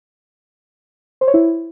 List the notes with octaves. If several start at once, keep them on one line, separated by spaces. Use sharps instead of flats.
C5
C#5
E4